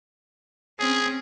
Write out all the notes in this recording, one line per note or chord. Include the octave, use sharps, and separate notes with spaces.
C4 C#4 G#4